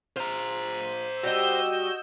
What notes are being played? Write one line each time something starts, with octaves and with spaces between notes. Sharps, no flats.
F4 C5 A#5
G3 F#4 G4 D#5 E6 G6